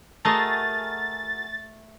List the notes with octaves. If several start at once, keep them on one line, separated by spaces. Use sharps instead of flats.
A3 F#4 G#4 A#4 D#5 A6